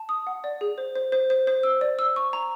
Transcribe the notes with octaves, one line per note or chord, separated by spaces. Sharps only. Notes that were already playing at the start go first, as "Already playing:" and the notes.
Already playing: A5
D#6
F#5
D5
G#4
C5
C5
C5
C5
C5
E6
D5
E6
C#6
A#5